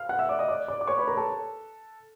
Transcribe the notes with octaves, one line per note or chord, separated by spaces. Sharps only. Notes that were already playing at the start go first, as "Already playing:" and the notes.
Already playing: F5 F6
F#5 F#6
E5 E6
D5 D6
D#5 D#6
D5 D6
D5 D6
D6
C#5 C#6
B4 B5
A#4 A#5
A4 A5